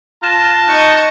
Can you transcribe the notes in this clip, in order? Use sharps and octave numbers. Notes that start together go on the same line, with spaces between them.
F4 A5 F#6 A#6 E7
D#4 D#5 C#6 F#6